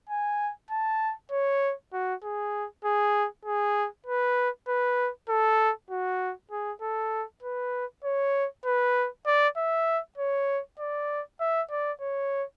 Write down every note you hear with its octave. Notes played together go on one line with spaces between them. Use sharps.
G#5
A5
C#5
F#4
G#4
G#4
G#4
B4
B4
A4
F#4
G#4
A4
B4
C#5
B4
D5
E5
C#5
D5
E5
D5
C#5